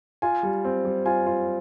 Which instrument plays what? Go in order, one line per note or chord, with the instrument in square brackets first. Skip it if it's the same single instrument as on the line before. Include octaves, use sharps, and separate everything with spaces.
[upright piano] F4 [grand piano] G#5
[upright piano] G3
C4
G3
[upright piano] F4 [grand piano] G#5
[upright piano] F4